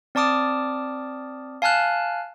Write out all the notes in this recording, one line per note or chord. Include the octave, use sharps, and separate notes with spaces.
C4 D5 A5 D6 D#6 F6
F5 G#5 A5 F6 F#6